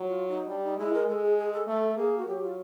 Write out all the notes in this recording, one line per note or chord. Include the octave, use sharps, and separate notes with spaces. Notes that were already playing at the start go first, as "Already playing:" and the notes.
Already playing: F#3
F4
D#4
G3 D4
D#4
G#3 E4
A#4
G#3 A4
G#4
G#4
A4
A3 A4
A#3 G#4
F#4
F#3 G4
F4